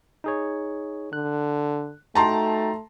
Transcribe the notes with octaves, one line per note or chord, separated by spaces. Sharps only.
D#4 G#4 C#5
D3 F#6
A3 D#4 F#4 G5 A5 A#5 C6